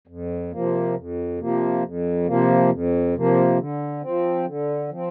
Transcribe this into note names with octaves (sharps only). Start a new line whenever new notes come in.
F2
C3 F3 A#3
F2
C3 F3 A#3
F2
C3 F3 A#3
F2
C3 F3 A#3
D3
F3 C4
D3
F3
C4